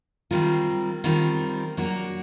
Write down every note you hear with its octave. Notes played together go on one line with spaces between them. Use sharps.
D#3 G3 C4 F4 A#4
D#3 G3 C4 F4 A#4
F#3 A#3 D4 F#4 A#4